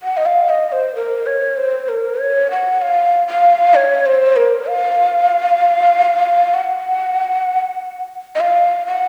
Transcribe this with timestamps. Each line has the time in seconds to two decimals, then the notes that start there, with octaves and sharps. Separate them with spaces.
0.03 F#5
0.17 D#5
0.26 F5
0.49 D#5
0.72 C5
0.95 A#4
1.26 C#5
1.57 C5
1.89 A#4
2.19 C#5
2.51 F#5
2.82 F5
3.28 F5
3.75 C#5
4.06 C5
4.36 A#4
4.68 F5
6.54 F#5
8.35 D#5
8.40 F5
8.86 F#5